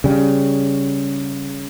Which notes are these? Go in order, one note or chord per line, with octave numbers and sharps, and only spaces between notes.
C#3 G3